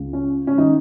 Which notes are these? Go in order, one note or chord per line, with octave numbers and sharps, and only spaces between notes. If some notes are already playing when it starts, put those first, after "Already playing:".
Already playing: C#2 C#3
C#4
C#4
D#3 D#4